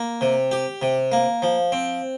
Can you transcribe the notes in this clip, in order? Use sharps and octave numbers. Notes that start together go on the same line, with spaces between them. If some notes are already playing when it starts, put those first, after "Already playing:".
Already playing: A#3
C3
G4
C3
A#3
F3
C4